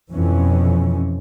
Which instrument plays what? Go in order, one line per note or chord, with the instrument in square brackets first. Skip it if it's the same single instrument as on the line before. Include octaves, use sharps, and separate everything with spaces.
[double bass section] F2 B2 E3 C#4